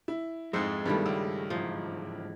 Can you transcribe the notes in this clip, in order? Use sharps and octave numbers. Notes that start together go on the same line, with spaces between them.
E4
F2 G#2 G#3 C5 E5 F#5
G2 D#3 G3 A3 B3 E4 A4
C#2
E2 G#2 F3 D#4 E4